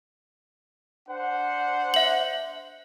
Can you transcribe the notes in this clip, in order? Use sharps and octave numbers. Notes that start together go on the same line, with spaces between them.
D4 C5 F#5
E5 F#7